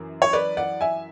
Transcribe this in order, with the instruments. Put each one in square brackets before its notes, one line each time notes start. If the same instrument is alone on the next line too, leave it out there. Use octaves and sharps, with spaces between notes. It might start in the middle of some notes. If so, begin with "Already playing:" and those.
Already playing: [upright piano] F#2 E3
C#5
B4 D5
D5 F#5
E5 G#5